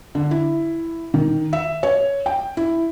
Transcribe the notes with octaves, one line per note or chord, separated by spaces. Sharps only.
D3
E4
D#3
E5
C#5
G5
E4